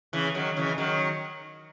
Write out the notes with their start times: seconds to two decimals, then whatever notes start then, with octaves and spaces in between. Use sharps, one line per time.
0.13 C#3 E3
0.34 D#3 F#3
0.56 C#3 E3
0.78 D#3 F#3